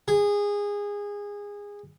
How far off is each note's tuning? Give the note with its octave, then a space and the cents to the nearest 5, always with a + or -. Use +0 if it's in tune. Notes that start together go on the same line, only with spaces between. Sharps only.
G#4 -20